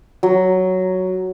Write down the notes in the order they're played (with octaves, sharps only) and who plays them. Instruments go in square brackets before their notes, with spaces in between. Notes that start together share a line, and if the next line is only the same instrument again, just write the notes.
[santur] F#3